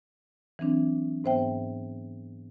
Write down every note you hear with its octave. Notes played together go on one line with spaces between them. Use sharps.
E3 F#3 C4 D4
G#2 B3 C5 E5 G5